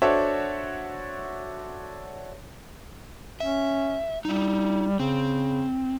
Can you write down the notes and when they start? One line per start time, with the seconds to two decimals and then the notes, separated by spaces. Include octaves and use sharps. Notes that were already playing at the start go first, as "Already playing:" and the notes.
0.02 D4 F#4 A4 C5 C#5 E5
3.40 C#4 E5
4.25 G3 D#4 E4
5.00 C#3 C4